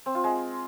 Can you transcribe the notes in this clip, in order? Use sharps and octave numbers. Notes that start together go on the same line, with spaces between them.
C4
F4
G#3